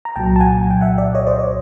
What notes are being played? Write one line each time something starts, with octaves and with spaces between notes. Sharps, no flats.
A#5
C2 A#2 F#3 G5 A5
A5
F#5 G#5
G5
E5 F#5
D5 E5
C#5 D#5
C5 D5
C#5 D#5